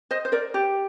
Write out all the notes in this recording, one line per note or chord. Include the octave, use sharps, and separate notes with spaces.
C5 D#5
C5
A#4 D5
G4